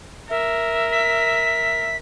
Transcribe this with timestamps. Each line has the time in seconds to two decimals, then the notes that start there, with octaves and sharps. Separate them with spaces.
0.30 A#4 E5
0.92 B6